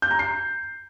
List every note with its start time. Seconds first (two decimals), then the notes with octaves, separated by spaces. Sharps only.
0.02 G6
0.11 A#5
0.19 C7